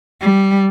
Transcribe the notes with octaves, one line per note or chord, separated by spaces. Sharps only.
G3